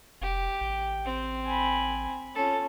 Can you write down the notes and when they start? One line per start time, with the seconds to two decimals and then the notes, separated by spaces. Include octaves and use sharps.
0.22 F1 G4
0.61 A1 G5
1.05 C4
1.46 G#5 B5
2.35 C#4 F4 A4